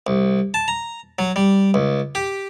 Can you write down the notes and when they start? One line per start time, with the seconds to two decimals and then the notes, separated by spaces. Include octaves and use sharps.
0.07 C2
0.54 A5
0.68 A#5
1.19 F#3
1.36 G3
1.74 C#2
2.15 G4